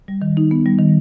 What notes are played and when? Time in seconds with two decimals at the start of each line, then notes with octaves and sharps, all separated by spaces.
0.08 G3
0.22 D#3
0.37 D#4
0.51 B3
0.66 G3
0.79 D#3